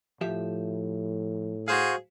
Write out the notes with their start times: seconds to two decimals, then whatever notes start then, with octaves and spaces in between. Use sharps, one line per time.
0.21 A2 F3 G4 E5
1.68 F#4 G#4 C5 F5